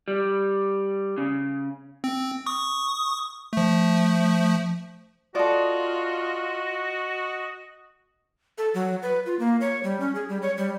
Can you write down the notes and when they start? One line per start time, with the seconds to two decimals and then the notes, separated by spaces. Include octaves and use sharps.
0.08 G3
1.18 C#3
2.04 C4
2.46 C#6 D#6
3.53 F3 A3
5.35 F4 F#4 A4 D5 D#5
8.58 A4
8.74 F#3
9.03 B4
9.26 F4
9.39 A#3
9.61 C#5
9.83 G3
10.00 C#4
10.15 G#4
10.29 G3
10.42 C#5
10.58 G3